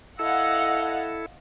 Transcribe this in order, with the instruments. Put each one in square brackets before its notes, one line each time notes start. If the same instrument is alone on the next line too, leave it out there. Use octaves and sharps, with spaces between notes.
[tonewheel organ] E4 A4 [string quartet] D#5 F5 [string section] F#5 [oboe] E6